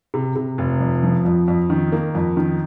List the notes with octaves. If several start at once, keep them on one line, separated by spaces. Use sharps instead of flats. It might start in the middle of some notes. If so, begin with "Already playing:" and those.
C3
C3
F1
F2
F3
F2
F2
D#3
A#3
F2
D#3